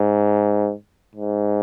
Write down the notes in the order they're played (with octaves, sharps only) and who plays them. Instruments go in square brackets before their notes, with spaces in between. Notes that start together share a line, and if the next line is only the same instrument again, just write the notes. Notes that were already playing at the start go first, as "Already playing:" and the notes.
Already playing: [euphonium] G#2
G#2